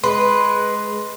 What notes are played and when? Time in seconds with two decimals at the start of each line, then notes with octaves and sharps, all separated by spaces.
0.04 G#3 B4 C6